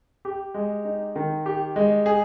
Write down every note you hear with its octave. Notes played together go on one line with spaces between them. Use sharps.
G4
G#3
D#4
D#3
G4
G#3
G#4